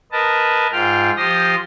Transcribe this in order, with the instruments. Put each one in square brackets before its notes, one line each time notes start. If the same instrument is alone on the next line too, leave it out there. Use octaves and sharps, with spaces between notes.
[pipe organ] A#4 B4 D#5 A5
G#2 F4 G5 F6
F3 G4 C6 D#6 A#6